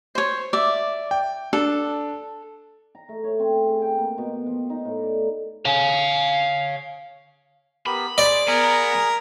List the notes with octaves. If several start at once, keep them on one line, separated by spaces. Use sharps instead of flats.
C5 C#5
D5 E5
G5
D4 A4
A#5
A3
C#5
C4
G#4
G5
A#3
B2
F3
D#4
A2
D5
C#5 F5
B3 G4 A#4 B5
G#4 C5 D5
B3 G#4 A#4 G#5 A#5